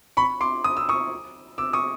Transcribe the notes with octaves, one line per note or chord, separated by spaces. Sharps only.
B5 C#6
C6 D6
D#6
E6
C#6 D#6
D6 E6
C#6 D#6